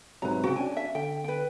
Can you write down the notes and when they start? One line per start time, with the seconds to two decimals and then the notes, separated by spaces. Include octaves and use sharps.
0.22 G#2 C3 F#3 B4 A#5
0.44 C#3 C4 F#4 G4 G5
0.56 C#4 D4 G#5
0.77 E5
0.95 D3 G5
1.24 B4 G5